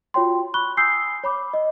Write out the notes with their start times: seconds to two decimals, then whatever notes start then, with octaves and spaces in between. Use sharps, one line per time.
0.14 F4 F#4 C#5 G5 C6
0.54 B5 C#6 F#6 G7
0.77 G#5 D#6 E6 G6 C7
1.24 C#5 B5 D6
1.54 D#5